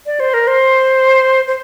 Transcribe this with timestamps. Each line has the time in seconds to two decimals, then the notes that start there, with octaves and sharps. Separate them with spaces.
0.06 D5
0.20 C5
0.34 A#4
0.47 C5
1.47 C5